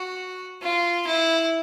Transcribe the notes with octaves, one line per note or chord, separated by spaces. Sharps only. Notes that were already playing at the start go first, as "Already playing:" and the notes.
Already playing: F#4
F4
E4